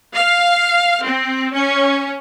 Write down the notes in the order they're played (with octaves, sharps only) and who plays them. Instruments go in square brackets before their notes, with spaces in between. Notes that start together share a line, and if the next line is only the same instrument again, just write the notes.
[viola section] F5
C4
C#4